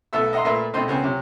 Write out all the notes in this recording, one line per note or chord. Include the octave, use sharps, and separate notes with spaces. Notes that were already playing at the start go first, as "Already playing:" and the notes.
B1 A3 B3 A4 E5 E6
D#5 E5 F#5 A#5 C6
A#2 A3 F4 B4 E5 C6
B2 A3 C4 D#4 C6
C#2 C#3 B3 C4
C3 F#3